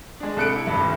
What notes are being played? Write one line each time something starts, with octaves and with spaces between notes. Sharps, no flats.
G#3 D4
C2 A4 F#6 C#7 D7
E4
F1 G2
D#1